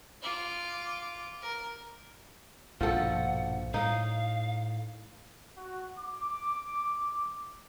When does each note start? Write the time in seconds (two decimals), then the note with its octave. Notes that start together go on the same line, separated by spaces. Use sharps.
0.22 F4 D6
1.41 A#4
2.81 A#1 G2 B2 F3 A4 F#5
3.74 A2 D#4 F5
5.58 F#4
5.99 D6